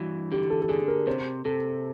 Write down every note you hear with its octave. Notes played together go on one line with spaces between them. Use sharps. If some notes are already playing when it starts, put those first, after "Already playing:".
Already playing: G2 E3 F#4
D3 G4
A4
A4
D3 G#4
A#4
C3 C5
C3 A4